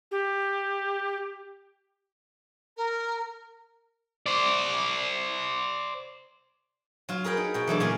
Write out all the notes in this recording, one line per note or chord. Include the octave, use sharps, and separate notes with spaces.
G4
A#4
C5 D5
F#3 F4
G#4 A#4 B4 G5
D#4
B2 G5
E3 F#3 A3 D4
A#2 C#3 F4 G#4 G#5